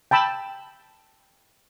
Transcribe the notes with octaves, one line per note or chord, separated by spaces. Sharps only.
G5 A5 B5 E6